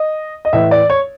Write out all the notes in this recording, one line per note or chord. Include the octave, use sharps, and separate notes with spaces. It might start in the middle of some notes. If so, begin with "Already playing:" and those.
Already playing: D#5
D#5
A2 E3 E5
D5
C#5